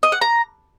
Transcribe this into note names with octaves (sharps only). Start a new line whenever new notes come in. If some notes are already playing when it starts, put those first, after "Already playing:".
D#5
F#5
A#5